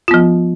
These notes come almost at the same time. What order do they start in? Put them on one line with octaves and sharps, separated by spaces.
F4 B3 F3